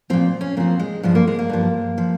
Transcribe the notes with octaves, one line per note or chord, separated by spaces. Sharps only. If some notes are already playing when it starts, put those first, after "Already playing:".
A#2 F3 C4
C#4
A#2 F3 C4
G#3
G2 F3 G#3
A#3
G#3
A#3
G2 F3
F3